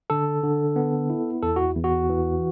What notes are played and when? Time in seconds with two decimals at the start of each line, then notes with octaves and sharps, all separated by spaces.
0.10 D3 A4
0.43 D3
0.76 B3
1.10 E4
1.43 E2 A4
1.56 F#4
1.76 E2
1.84 F#4
2.09 E3